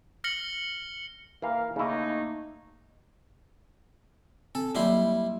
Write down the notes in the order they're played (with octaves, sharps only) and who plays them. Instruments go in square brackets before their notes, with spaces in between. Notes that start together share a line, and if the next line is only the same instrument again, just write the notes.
[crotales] F6 A#6 C#7 F#7 G7
[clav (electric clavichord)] E3 A#3 [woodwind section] A#4 F5
[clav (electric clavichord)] C#3 E4 [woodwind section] A3 A#3 [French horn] D#4
[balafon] C4 [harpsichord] A4
[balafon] F#3 A#3 D5 [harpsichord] G3 E4 C6